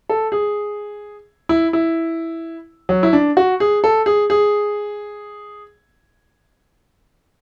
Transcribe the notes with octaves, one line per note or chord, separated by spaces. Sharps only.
A4
G#4
E4
E4
F#3
E4
D4
F#4
G#4
A4
G#4
G#4